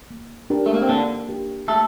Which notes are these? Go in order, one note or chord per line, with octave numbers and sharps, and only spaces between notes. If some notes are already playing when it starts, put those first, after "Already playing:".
A#3
D4 G4 A#4
A3
A#3
C4
D3 A#3 D4
D4 G4 A#4
A3 A#3 A4